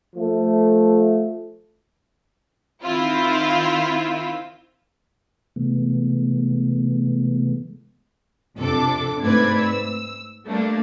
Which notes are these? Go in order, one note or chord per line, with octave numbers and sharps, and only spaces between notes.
F3 A3
D#3 C4 E4 F4
C3 E3 G#3 A3 B3
F2 C3 D4 A4 D6
G#2 A3 C4 B4 D5 G#6
E6
G3 A3 A#3 D4